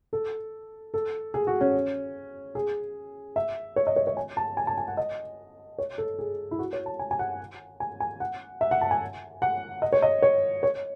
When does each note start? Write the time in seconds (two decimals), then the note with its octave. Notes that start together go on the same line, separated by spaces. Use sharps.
0.13 A4
0.94 A4
1.34 G#4
1.47 F#4
1.61 C#4
2.55 G#4
3.36 E5
3.76 C#5
3.87 D#5
3.96 C#5
4.07 C#5
4.17 G#5
4.37 A5
4.57 G#5
4.67 A5
4.78 G#5
4.88 F#5
4.97 D#5
5.79 C#5
5.98 A4
6.19 G#4
6.51 E4
6.59 F#4
6.73 C#5
6.86 A5
6.99 G#5
7.11 G#5
7.19 F#5
7.80 G#5
8.00 G#5
8.20 F#5
8.61 E5
8.71 F#5
8.81 A5
8.91 G#5
9.42 F#5
9.82 D#5
9.93 C#5
10.02 D#5
10.22 C#5
10.63 C#5